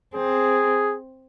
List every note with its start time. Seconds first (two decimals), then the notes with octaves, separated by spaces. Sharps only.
0.15 C4 G#4